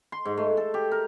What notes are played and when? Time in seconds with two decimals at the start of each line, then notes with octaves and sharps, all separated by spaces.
0.12 C6
0.25 G#2
0.37 A3
0.57 A4
0.74 G4
0.91 A#4